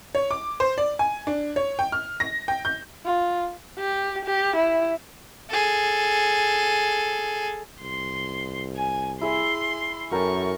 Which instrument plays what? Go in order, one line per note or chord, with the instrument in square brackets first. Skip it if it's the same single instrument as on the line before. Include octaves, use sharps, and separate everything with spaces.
[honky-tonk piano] C#5
D6
C5
D5
G#5
D4
C#5
G5
F6
A#6
G5
G6
[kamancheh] F4
[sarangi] G4
G4
E4
[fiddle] G#4 A4
[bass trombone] C2 [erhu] C6
[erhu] G#5
[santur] E4 G#4 E5 [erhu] C6
[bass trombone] F#2 [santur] A4 A#4 G5 [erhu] C#6